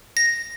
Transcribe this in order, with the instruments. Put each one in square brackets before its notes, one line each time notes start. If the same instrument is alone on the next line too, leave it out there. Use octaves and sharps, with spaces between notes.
[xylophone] A#6